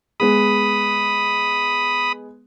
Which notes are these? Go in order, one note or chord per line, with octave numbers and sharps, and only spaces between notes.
G#3 B3 G#4 B5 D#6